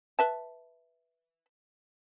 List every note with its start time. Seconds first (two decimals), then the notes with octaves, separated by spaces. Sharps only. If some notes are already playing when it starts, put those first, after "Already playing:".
0.19 B4 E5 A5